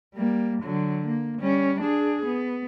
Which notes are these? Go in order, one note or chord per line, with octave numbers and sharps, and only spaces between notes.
G3 A#3
D3 F#3
A#3
G3 C#4
D4 G#4
B3